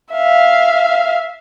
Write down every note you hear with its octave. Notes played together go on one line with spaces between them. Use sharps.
E5 F5